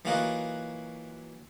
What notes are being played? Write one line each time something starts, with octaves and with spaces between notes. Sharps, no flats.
E3 F#3 A#3 F4 F#4 D#5